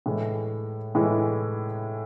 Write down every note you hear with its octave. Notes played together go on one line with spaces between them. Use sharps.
A2 E3 G#3
A2 E3 G#3